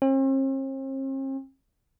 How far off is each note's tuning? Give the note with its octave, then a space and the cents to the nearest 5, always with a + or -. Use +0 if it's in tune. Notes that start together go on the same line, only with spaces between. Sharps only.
C4 +45